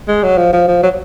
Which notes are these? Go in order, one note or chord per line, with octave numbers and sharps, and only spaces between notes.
G#3
F#3
F3
F3
F3
F#3